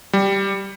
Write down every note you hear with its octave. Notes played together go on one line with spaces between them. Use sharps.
G3